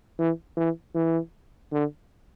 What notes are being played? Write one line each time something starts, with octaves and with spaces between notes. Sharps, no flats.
E3
E3
E3
D3